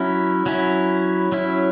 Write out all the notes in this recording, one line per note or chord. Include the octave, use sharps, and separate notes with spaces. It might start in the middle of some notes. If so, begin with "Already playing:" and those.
Already playing: F#3 C#4 E4
F#3 C#4 E4
F#3 C#4 E4